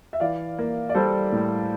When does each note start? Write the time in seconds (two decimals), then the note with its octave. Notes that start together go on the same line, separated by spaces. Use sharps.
0.13 E5
0.20 E3 D5 F5
0.59 A#3
0.89 D5
0.95 G3 A4 C5
1.32 A2